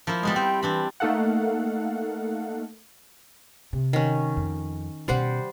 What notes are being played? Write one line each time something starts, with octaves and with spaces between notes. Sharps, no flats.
F3 A#3 E4
G3 G#3 B3 G#4
C4 G5
E3 C4 D4 B5
A3 A#3 D#4 A4 F5 F#5
C3
D#3 C#4
F2
B2 G3 C#4 C5 F#5